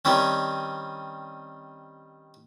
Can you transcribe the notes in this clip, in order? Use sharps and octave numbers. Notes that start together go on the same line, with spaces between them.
D#3 G3 C4 C#4